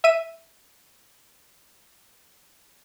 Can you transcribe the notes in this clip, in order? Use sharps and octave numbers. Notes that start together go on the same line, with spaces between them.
E5 D#7